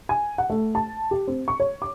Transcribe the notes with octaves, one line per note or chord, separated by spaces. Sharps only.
G#5
F#5
A3
A5
G4
C4
C#6
C#5
D6